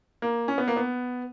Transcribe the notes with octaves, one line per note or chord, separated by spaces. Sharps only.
A#3
C#4
B3
A#3
B3